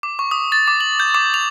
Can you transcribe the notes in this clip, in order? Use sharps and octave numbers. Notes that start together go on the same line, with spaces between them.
D6
C#6
D#6
A6
D6
F#7
G6
D6
F7